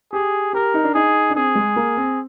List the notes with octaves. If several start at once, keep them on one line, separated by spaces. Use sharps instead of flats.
G4 G#4
G4 A#4
D#4
D4
D#4 G#4
D4
C4 G#4
G#3
A#3
C4